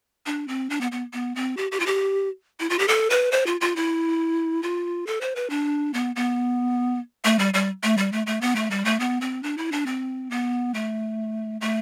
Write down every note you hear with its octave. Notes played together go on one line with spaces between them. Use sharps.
D4
C4
D4
B3
B3
B3
C4
G4
G4
F4
G4
E4
F4
G4
A4
B4
C5
F4
F4
E4
F4
A4
C5
B4
D4
B3
B3
A3
G3
G3
A3
G3
A3
A3
B3
A3
G3
A3
B3
C4
D4
E4
D4
C4
B3
A3
A3